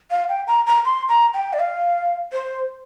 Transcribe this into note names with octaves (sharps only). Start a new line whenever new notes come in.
F5
G5
A#5
A#5
C6
A#5
G5
D5
F5
C5